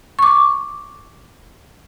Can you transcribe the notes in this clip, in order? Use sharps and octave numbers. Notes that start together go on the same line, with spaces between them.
C#6 D6